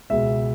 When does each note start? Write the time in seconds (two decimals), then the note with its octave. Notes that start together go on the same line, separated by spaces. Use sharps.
0.10 C#2 B2 E5